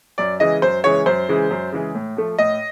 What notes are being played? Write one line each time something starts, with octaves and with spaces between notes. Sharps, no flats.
F#2 D5
C#3 E3 G#3 D#5
F#2 C5
C#3 E3 G#3 C#5
F#2 C5
C#3 E3 G#3
F#2
C#3 E3 G#3
A2
F3 A3
A2 D#5